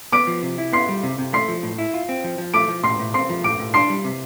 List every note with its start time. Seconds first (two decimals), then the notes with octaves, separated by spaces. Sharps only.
0.12 B3 D6 D7
0.27 F3
0.43 C3
0.58 E4
0.73 B3 C6 C7
0.89 G3
1.03 C3
1.18 C3
1.33 A3 C6 C7
1.49 F3
1.63 A2
1.78 E4
1.94 F4
2.09 C4
2.24 F3
2.38 F3
2.54 A3 D6 D7
2.68 F3
2.83 A2 C6 C7
2.99 A2
3.14 C4 C6 C7
3.29 F3
3.44 A2 D6 D7
3.59 A2
3.74 D4 C6 C7
3.90 G3
4.04 C3